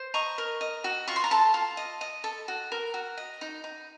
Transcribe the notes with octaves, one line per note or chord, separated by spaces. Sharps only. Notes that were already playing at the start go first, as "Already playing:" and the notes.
Already playing: C5
D#5 A#5 C#6
A#4
D#5
F#4
F4 C#6
C6
A#5
A4 A5 C6
F4
D#5
D#5
A4
F#4
A#4
F#4
D#5
D#4
D#4